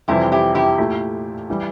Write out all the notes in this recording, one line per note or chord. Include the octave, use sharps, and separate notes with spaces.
F2 C3 E3 G3 C4 E4 G4
E4 G4
E4 G4
A#2 A3 E4 G4
E3 G3